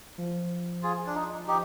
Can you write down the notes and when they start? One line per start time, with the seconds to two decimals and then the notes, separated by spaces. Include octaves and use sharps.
0.18 F3
0.83 F4 G#4
1.06 D4
1.15 D#4
1.47 F3 D#4 G4